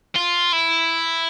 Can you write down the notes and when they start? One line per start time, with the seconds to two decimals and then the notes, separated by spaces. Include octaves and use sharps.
0.15 F4
0.53 E4